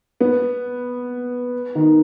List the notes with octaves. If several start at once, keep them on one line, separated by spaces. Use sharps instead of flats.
B3
D#3